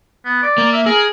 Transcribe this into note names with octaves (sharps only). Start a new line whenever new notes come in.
B3
D5
A#3
E5
G#4 A#4